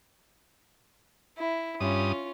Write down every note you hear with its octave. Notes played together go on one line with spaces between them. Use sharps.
E4
G2 C#4 F4 D#6